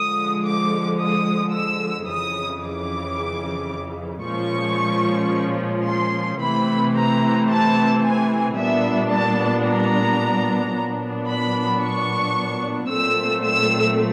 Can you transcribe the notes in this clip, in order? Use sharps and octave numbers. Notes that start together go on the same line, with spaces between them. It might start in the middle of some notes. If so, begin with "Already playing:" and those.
Already playing: D3 F3 G#3 D#6
D6
D#6
E6
F2 C#3 E3 D#6
D6
A#2 F3 G#3 C#4 C#6
C6
C3 E3 A3 C4 B5
A#5
A5
G#5
A#2 G3 B3 D4 E5
A5
A#5
A#2 F#3 B3 D4
B5
C#6
A#2 F#3 A3 C4 E6
E6